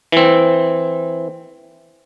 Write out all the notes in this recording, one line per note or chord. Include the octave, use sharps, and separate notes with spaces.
E3 C4